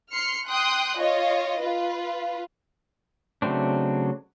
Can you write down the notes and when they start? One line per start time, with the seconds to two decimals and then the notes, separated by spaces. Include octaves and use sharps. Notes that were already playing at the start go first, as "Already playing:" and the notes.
0.12 C6 F6 C7 C#7
0.48 G5 C6 D#6 F#6
0.98 F4 C#5 D#5
1.59 F4 B4
3.42 C#3 F#3 A3 C4 D4